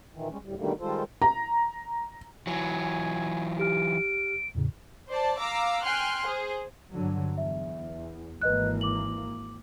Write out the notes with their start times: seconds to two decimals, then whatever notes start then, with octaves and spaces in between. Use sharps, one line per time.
0.13 A#2 D#3 E3
0.30 G3 G#3 C#4
0.43 D2 A2 G3
0.57 B2 D3 D#3 G3 A3 A#3
0.80 D#3 G3 G#3 F4 A4 C5
1.22 A#5
2.47 E3 F#3 G#5
3.59 G4 F6 D7
4.55 E2 A2 C#3
5.09 C5 D5 A5
5.40 F5 A#5 D6 E6
5.84 G5 G#5 C6 F6 F#6
6.27 G#4 C5
6.91 G2 D3 F#3
7.38 E2 E5
8.41 G#1 E3 A#3 B4 D#5 F#6
8.81 D6 F#7